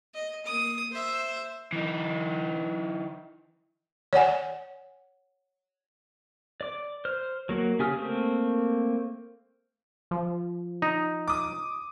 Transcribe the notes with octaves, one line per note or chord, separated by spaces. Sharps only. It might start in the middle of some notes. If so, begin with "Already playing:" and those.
D#5
A#3 D#6
C5 E5
E3 D#4
C#5 D5 F#5 G#5
D5 D6
C5 F6
F#3 A#3 F#4
C#3 G4 G#5 D#6 F6
A3 A#3 C4
F3
D#4
D6 D#6